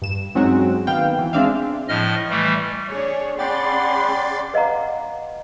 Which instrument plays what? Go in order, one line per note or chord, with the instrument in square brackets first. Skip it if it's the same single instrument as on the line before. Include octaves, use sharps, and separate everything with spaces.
[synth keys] G2 E7
F#3 G#3 C4 C#4 D#4 F#4
D#3 A#3 B3 F5 G5
E3
G#3 C4 D4 D5 E5 F5
[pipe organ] A2 F3 D#5 F6
E3 G3 A3
[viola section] D4 G#4 C#5
[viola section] C#4 G#4 C6 [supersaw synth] D5 A6 [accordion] F#5 G5 B5
[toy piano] B4 D#5 F5 F#5 A#5